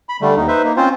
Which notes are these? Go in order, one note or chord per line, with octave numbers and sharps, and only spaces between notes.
B5
D3 G3 A3
D#2 D#4
D#4 B4 C5 E5
A#3 D#4
C4 C#4 F4 C5